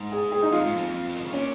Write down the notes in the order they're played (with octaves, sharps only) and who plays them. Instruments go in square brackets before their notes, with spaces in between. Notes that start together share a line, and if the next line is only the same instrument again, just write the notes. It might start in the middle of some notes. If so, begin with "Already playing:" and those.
Already playing: [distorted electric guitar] G#2
[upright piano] G#4
G#4
D#4
[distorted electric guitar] F2 [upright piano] F4
[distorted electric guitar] G#2
F2
F3
D#3
C#3
[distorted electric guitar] A#2 [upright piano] C#4